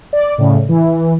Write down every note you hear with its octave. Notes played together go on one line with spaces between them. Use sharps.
D5
A2 C#3
E3